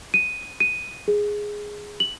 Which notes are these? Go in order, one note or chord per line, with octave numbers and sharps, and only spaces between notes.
D#7
D#7
G#4
F#7